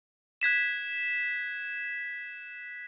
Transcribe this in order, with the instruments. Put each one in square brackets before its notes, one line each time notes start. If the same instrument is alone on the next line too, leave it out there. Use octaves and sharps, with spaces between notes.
[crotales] F#6 G#6 B6 E7